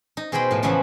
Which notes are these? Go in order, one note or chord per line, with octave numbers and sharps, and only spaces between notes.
D#4
B2 G#4 C5 D#5 G5 B5
A2 F3
C#3 E3 F3 B3 E5 B5